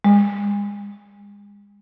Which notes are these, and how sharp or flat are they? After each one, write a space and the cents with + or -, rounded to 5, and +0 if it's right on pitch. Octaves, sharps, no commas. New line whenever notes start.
G#3 -40